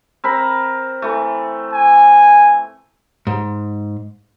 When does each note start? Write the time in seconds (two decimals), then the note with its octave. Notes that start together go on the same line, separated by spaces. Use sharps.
0.24 C4 A#4 B5
1.02 E3 A3
1.73 G#5
3.27 G#2